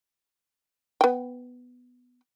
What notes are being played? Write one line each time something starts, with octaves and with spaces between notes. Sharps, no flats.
B3 G5